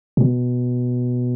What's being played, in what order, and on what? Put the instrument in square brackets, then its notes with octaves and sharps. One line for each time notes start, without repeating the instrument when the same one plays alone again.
[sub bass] B2